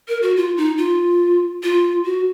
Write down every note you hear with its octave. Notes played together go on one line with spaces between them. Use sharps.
A#4
F#4
F4
D#4
F4
F4
F#4